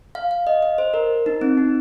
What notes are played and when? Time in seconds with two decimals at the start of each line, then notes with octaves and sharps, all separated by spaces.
0.15 F5
0.31 F5
0.47 D#5
0.63 D#5
0.78 C5
0.94 A#4
1.26 D#4
1.41 C4
1.58 D#4